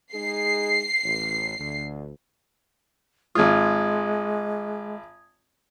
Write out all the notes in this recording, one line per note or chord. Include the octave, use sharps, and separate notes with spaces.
G#3 D#4 G#4 C7
A1
D2
G#1 G#3 F4 D#6 G#6